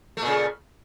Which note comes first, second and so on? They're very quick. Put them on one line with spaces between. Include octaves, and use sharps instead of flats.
A3 A#2 C#3